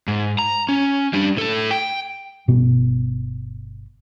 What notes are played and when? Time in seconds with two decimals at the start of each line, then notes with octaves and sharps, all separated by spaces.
0.08 G#2
0.39 A#5
0.69 C#4
1.13 G3 D4
1.37 A2 A4
1.71 G5
2.48 G1 B2 B3